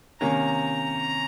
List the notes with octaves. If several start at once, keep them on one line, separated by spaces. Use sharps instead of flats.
C3 D#3 A#3 C#4 A#5